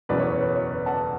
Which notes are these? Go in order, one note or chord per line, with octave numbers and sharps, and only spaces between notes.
F#1 E2 B2 B4 D5
C#5
C#5
B4
C#5
B4
F#5 A5